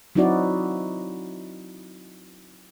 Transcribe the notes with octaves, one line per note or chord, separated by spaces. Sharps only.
F#3 C4 D#4 E4 F#4 D5